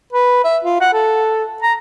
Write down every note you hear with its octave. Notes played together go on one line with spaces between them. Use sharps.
B4
E5
F4
F#5
A4
A#5